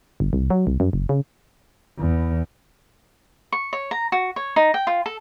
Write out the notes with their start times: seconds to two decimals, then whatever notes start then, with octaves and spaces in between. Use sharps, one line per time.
0.20 G1
0.33 C2
0.50 F#3
0.67 C2
0.80 F#2
0.93 F#1
1.09 C#3
1.98 E2
3.52 C#6
3.73 C#5
3.91 A#5
4.12 F#4
4.36 C#5
4.56 D#4
4.74 G5
4.87 F4
5.06 A4